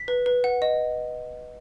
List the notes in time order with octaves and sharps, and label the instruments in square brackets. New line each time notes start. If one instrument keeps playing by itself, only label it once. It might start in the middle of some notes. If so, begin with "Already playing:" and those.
Already playing: [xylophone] B6
B4
B4
F#5
D#5